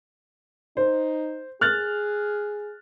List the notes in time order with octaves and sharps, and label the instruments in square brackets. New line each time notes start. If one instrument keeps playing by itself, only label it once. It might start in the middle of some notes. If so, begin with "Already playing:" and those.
[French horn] D#4 [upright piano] C5
[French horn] G#4 [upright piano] F6 F#6 A6